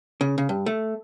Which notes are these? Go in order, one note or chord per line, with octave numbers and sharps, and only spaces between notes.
C#3
C#3
G2
A3